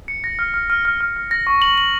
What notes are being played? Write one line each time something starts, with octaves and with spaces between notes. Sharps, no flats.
C#7
A#6
F6
F6
F6
F6
F6
F6
A#6
C#6
F#7
F#7